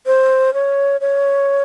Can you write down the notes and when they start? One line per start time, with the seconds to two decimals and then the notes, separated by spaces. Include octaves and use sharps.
0.06 C5
0.54 C#5
1.01 C#5